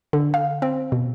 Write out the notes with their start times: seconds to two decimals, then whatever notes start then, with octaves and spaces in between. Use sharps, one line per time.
0.13 D3
0.34 F5
0.62 C4
0.92 B2